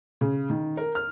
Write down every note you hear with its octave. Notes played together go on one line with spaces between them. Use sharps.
C#3
D#3
A#4
F6